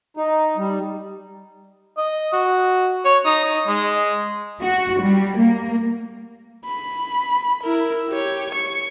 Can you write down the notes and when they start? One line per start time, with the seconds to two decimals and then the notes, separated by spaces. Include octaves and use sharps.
0.17 D#4
0.57 G3
1.97 D#5
2.33 F#4
3.05 C#5
3.26 D#4
3.44 D#4
3.67 G#3
4.63 F#4
5.02 G3
5.39 A#3
6.65 B5
7.63 E4 A#4
8.09 G4 C#5
8.52 C#6 C#7